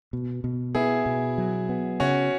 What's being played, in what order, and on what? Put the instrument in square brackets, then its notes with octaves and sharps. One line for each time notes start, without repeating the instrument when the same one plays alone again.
[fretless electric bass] B2
B2
[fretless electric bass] B3 [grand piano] E4 G#4
[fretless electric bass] B2
F#3
B3
[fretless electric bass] C#3 [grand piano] C#4 F#4